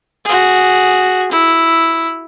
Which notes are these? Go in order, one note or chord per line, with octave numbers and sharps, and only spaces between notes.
F#4 G#4
E4